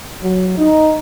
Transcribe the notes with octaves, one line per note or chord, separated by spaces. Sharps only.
F#3
D#4